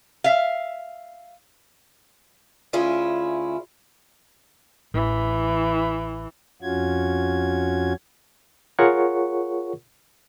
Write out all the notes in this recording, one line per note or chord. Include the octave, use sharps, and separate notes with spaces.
E5 F5
D2 C#4 E4 F4 G#4
A1 E3
F2 C#4 F4 F#4 G#6
F4 G#4 A#4 C#5 F#5 C#6